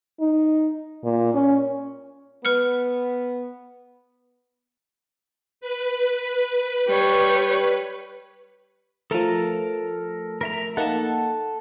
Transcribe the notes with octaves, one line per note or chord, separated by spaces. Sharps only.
D#4
A#2
C#4
B3 B4 F6 C#7
B4
G3 C#5
F3 A3 A4 A#4 A#5
A#4 E5 A#5
A#3 D#4 A4 F#5 A5